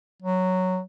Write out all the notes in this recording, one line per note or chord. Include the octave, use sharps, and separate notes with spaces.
F#3